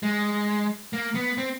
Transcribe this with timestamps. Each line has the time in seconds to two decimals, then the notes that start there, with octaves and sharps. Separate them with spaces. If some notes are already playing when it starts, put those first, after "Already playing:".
0.03 G#3
0.93 A#3
1.15 B3
1.38 C4